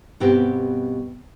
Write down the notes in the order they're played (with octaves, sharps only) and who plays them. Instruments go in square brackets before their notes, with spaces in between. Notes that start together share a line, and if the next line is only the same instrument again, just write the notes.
[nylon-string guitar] G2 B2 B3 C4 G4